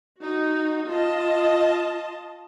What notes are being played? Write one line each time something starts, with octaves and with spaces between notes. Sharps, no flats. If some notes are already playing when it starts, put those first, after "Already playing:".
D#4 F#4
F4 D#5 A5